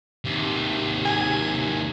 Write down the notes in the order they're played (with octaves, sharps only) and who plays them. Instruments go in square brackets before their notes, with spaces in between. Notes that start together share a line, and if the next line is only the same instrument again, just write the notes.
[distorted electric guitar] D#2 C3
[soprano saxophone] G#5